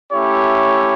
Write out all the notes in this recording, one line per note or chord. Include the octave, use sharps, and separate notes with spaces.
A3 C#4 E4 G4 C#5